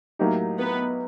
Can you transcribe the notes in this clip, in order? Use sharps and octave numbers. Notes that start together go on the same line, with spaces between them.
A2 F#3 A#3 D#4 G4
B3 B4